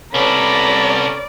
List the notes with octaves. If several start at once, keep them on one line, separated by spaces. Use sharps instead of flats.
C2 B3 C#4 A4 D5 A#5 B5